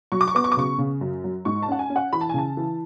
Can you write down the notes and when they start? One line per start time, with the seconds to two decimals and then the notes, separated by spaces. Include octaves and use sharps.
0.12 F#3 C#6
0.21 D6
0.28 C#6
0.35 B3 D6
0.44 C#6
0.52 D6
0.57 C#3 C#6
0.78 C#3
1.01 F#2
1.24 F#3
1.45 G#2 C#6
1.62 A5
1.68 C#4 F#5
1.79 G#5
1.90 C#4
1.96 F#5
2.13 E3 B5
2.21 A5
2.29 G#5
2.34 C#3 A5
2.57 E3